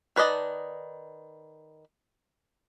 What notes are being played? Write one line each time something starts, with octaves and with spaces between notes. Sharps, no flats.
D#3 B4 D5 D#5 A5